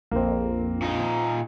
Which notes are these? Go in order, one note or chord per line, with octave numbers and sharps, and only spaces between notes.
A#1 F2 A#3 C4
A#2 D#4